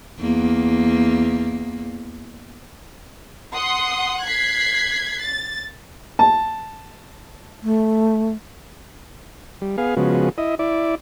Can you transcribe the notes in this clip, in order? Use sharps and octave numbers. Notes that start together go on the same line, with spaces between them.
E2 A#3
F#5 C6 D#6
F#6 G#6 B6 C7
A6
A5
A3
G3
B3 G#4 F5
C#3 F3 G#3 B3 F#4
E4 D#5
E4 D5